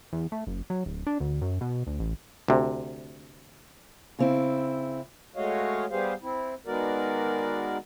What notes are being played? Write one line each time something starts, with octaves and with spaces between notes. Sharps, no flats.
E2
A3
F#1
F#3
D1
D4
D2
F#2
B2
D2
A1
D2 C3
C#3 C4 E4
G#3 A3 F#4 C#5 D#5 F5
G3 B3 G4 G#4 C5 F5
C4 E4
D#3 G#3 B3 F#4 A#4 D5